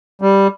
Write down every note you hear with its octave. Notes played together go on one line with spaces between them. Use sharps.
G3